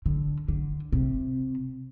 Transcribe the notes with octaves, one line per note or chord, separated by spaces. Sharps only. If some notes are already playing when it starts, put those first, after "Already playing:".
D3
D3
C3